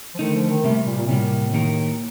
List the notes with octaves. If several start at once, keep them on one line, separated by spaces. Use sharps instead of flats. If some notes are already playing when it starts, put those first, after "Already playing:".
F3
D3 D#3 A3 D#4
F3
D#3
C3 G3 A3 A#3
A#2
A#2
A2 C3 G3 A#3
D#3 A#3 D#4 G4 A#4